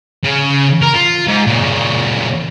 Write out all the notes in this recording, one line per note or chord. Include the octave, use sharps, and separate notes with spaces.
C#3
A#4
F4
G#2
A#2 C#3